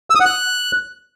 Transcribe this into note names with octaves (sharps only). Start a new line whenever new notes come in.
E6
D#6
F#5
F#6